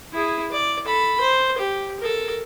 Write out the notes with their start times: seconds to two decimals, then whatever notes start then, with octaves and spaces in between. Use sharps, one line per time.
0.13 E4 G#4
0.52 D5
0.86 A4 B5
1.21 C5
1.58 G4
2.00 A4 A#4